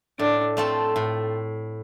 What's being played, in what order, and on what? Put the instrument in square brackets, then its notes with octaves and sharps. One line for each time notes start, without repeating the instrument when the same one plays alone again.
[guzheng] A2 [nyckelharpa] D4
[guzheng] A3 C4 F4 A4
A2